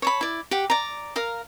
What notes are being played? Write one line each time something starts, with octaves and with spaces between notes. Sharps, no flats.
C#5 A5 B5
E4 D5
G4 F#5
D5 A#5
A#4 F5 A#5